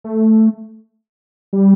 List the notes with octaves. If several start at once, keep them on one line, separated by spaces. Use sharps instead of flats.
A3
G3